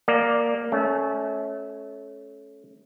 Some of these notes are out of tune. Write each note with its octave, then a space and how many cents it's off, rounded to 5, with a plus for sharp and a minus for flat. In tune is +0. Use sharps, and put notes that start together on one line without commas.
A#3 +0 D5 +0
A3 -25 C#4 +0